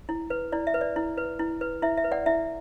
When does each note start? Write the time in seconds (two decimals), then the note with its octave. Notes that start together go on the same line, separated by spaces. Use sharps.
0.09 E4
0.30 B4
0.52 E4 D5
0.67 E5
0.74 B4
0.81 D5
0.96 E4
1.18 B4
1.39 E4
1.61 B4
1.82 E4 E5
1.97 E5
2.04 B4
2.12 D5 F#5
2.26 E4 E5